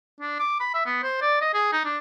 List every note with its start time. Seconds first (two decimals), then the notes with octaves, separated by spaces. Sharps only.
0.20 D4
0.39 D6
0.60 B5
0.74 E5
0.86 B3
1.03 C5
1.21 D5
1.41 D#5
1.54 G#4
1.72 D#4
1.85 D4